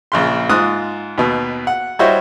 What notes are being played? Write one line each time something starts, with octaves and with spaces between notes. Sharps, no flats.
A#1 C#3 C6
G#2 F4 D#6 F#6
D#2 B2
F#5
G3 E4 F#4 C5 C#5 D#5